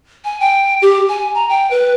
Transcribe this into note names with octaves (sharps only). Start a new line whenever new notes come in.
G#5
G5
G4
G#5
A#5
G5
B4